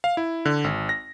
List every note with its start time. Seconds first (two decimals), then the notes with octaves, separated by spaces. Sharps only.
0.04 F5
0.17 E4
0.45 D3
0.64 G#1
0.89 A#6